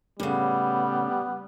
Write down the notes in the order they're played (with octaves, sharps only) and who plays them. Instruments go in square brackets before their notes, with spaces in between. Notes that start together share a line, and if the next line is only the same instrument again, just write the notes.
[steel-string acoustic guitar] A2 C#3 [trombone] G3 [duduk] B3